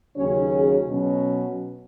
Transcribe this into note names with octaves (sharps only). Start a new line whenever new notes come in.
D#2 C#3 F#3 C#4 C#5
G#4
B2 F#3 C#4